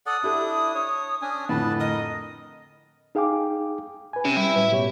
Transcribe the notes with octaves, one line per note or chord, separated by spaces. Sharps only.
A4 D5 F#5 D#6
D4 E4 G4 A4
C#5
C#4 D4 G#5
F2 A2 D3 B4 A5
A#4 D#5 D#6
D#4 G#4 F5 G5 G#5 D6
B4 G#5
C3 C#4 G5
G3 E4
A2 F#3 B4
B2 G4 C#5